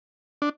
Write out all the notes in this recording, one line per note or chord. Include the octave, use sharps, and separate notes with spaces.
D4